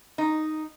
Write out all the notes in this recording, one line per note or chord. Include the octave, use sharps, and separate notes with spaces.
D#4